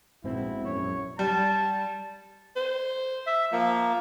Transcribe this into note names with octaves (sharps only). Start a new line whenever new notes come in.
A#1 G#2 B2 B3 C4 E4
A#1 F#2 C#5
G3 A5
C5
E5
F3 A#3